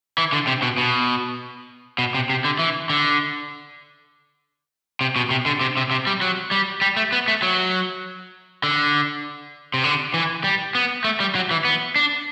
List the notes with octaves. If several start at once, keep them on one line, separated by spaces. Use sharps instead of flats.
E3
D3
C3
B2
B2
B2
C3
C3
D3
E3
D3
C3
B2
C3
D3
C3
C3
C3
G3
F#3
G3
G3
A3
B3
A3
F#3
D3
C3
D3
E3
G3
B3
A3
G3
F#3
E3
B3
D4